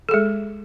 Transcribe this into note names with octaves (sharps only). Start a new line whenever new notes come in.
G#3 G#4 A4